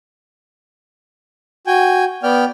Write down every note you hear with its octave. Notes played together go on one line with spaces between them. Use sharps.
F#4 G5 G#5
B3 D5 G5 F6